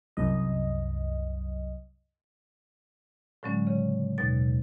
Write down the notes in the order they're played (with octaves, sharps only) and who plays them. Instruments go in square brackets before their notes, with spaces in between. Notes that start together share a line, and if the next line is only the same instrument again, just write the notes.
[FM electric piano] C2 F#2 D#5
[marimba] A2 D3 F#3 G#3 C#4
C#3
D#2 B2 A6